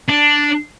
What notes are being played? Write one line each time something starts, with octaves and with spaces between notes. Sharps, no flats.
D4